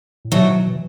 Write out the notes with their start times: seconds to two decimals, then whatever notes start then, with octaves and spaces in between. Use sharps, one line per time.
0.25 A2
0.32 B2 F#3 A3
0.67 E3